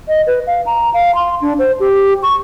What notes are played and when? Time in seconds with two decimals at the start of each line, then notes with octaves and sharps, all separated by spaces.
0.08 D#5
0.27 B4
0.47 F5
0.66 A#5
0.94 F5
1.15 C6
1.42 D4
1.59 C5
1.80 G4
2.23 C#6